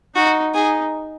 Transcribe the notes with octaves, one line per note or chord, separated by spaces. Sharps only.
D#4 F#4
D#4 G#4